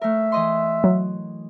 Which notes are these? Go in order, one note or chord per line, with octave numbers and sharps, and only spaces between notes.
A3 A#4 E5
E3 D#5 C6
F#3